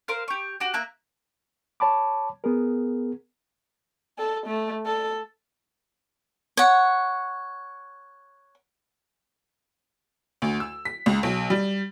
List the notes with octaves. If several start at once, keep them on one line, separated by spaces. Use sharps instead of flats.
A#4 C5 F5
G4 C#6
F#4 G4
A#3 E5 A#5 F#6
C#5 A5 B5 D6
B3 G#4 A#4
A4
A3
A4
C#5 F#5
D2
E6
B6
C#2
B1
G3